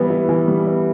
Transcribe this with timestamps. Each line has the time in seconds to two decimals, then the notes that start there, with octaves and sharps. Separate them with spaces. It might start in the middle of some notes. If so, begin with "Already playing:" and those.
Already playing: E3 G3 B3 B4
0.10 E4
0.29 E3
0.48 G3
0.67 B3